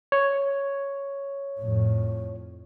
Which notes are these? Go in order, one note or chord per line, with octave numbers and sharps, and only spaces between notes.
C#5
F2 A2